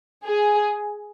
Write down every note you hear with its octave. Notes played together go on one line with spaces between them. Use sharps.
G#4